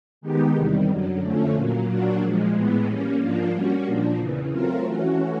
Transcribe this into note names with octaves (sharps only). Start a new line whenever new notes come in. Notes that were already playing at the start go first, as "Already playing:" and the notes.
D#3 G#3 B3 D#4 G4
E2 C3 D#3 G3
F#2 D3 F#3
F2 D3 F3 A3 C#4
A#2 F#3 A#3
A#2 F#3 A#3 D4 F#4
A#2 F3 G#3
A2 E3 G#3 B3
G3 A#3 C#4
G#2 F3 A#3 D4 F4
G3 A#3 C#4 F#4
A#2 F3 A#3 D4
E2 C#3 E3
F#3 A3 C4 F4 A#4
E3 A3 C#4 F#4